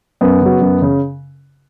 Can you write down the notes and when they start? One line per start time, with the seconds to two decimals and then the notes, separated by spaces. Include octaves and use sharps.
0.21 F#2 B3
0.41 C#3 F#3
0.61 F#2
0.82 C#3